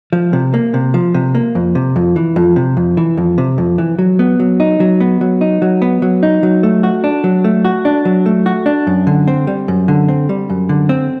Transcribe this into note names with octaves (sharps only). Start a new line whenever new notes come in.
F3
C3
A#3
C3
F3
C3
A#3
F2
C3
F2
E3
F2
C3
F2
E3
F2
C3
F2
E3
F#3
B3
F#3
D#4
F#3
B3
F#3
D#4
F#3
B3
F#3
D#4
F#3
A3
F#4
D4
F#3
A3
F#4
D4
F#3
A3
F#4
D4
F#2
D3
C4
G3
F#2
D3
C4
G3
F#2
D3
C4